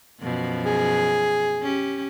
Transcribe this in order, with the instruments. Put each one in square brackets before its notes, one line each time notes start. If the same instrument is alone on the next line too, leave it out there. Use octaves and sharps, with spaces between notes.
[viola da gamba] F#2 B2 F3
[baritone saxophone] G#4
[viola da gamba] C#4 G4